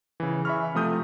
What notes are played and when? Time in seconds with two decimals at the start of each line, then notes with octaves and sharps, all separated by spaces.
0.20 C#3 E3
0.45 E5 G#5 B5 C#6 F6
0.75 C3 F3 A3 D#6 G6